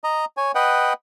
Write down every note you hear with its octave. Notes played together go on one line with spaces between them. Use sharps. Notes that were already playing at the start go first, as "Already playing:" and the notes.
D#5 A#5
C#5 G#5
B4 D#5 F#5 G5